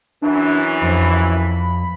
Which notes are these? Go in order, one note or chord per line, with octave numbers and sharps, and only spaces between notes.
F#2 E3 D4
F2 B5